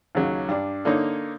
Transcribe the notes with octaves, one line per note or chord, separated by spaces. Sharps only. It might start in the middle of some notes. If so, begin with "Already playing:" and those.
D#2 C#3 F#3 C#4
G2 D4
D3 A#3 D#4 C#5